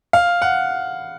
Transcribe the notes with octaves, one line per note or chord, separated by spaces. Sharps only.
F5
F#5